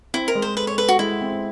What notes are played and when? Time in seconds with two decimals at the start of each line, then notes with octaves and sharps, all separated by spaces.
0.14 C4 E4
0.28 A#4
0.35 G#3
0.42 C5
0.57 A4 B4
0.67 C#5
0.78 A4 B4
0.89 F#4
0.99 G#3 E4
1.21 C4